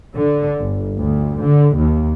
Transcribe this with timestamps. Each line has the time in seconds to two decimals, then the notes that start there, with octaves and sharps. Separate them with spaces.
0.17 D3
0.60 G1
0.98 D2
1.40 D3
1.77 D#2